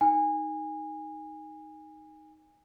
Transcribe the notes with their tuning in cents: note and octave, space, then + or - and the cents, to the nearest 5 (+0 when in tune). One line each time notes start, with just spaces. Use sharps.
D#4 +0 G#5 -20